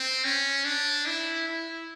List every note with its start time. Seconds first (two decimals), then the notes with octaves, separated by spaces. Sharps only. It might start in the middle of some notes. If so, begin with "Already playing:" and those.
Already playing: C4
0.24 C#4
0.65 D4
1.06 E4
1.47 E4